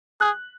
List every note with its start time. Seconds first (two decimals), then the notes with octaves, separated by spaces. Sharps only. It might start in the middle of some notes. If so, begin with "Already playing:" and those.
0.21 G#4 F#6